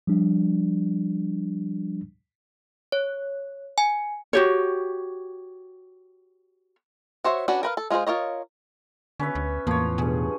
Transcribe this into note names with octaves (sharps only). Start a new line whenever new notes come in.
F3 G3 D4
C#5
G#5
F#4 G4 C#5
F#4 C5 C#5 E5
C#4 D4 F#4 B4
A#4 B4 F5
A4
G#3 F4 F#4 G#4 C5
F4 A#4 C#5 D#5
D3 C#4 B4 E5
D2
E2 A2 F3 A#3 C#5
G2 B2 G#4